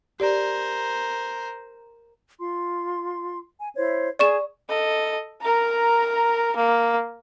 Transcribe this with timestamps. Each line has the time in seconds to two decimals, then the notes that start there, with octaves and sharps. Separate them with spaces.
0.20 G4 A#4 C5 D5
2.40 F4 C6
3.60 G#5
3.76 E4 C5 C#5
4.19 G#4 D5 C#6 E7
4.68 A4 D#5
5.41 A#4 A#5
6.56 A#3